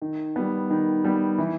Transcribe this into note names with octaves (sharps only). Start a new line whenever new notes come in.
D#3
G3 B3
D#3
G3 B3
E3